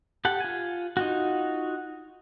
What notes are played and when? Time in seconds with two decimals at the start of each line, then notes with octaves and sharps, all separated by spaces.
0.25 G4 A4 F#5
0.40 F4 G#5
0.97 D#4 F4 F#4